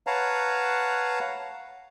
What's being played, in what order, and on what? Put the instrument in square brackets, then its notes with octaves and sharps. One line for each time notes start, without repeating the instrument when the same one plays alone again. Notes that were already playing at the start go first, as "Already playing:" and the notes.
[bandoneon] B4 C#5 F5 F#5 A5 A#5